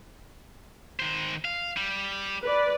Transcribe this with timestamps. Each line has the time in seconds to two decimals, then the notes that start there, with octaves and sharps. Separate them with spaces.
1.00 D#3 C5
1.45 F5
1.77 G3
2.43 B4 D5